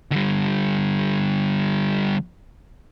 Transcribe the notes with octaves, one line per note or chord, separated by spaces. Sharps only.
D3 G3